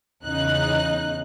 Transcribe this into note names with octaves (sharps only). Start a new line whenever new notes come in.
E2 C#3 D#4 F#6